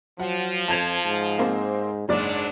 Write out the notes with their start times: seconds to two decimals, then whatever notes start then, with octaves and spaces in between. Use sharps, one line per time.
0.19 F3 F#3 F#5
0.68 F2 A5 G#6 F7
1.05 G#2
1.39 A#3 C4 C5
2.09 F#1 G#2 F#3 D4 D5